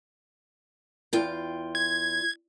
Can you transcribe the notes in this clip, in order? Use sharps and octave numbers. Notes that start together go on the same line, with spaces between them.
E2 F4 G5
G#6